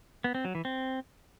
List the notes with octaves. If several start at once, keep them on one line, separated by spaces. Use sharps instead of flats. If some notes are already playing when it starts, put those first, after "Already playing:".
B3
C4
F#3
E3
C4